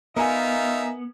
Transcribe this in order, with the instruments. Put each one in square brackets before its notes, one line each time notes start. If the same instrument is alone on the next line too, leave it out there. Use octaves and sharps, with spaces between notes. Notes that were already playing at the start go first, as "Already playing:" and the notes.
[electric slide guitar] B3 [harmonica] D#4 F4 E5 [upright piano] A#4 G#5